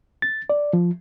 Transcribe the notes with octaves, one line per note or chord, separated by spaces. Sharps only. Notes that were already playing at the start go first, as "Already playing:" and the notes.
A6
D5
F3